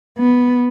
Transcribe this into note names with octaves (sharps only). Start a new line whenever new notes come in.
B3